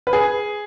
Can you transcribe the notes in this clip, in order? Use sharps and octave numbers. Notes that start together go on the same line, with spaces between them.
B4
G#4